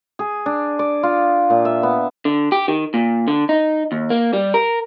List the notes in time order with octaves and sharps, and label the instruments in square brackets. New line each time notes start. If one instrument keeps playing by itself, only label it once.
[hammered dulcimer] G#4
D4
D5
F4
A#2
E5
B3
[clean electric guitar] D3
G4
D#3
A#2
D3
D#4
D#2
A#3
G3
A#4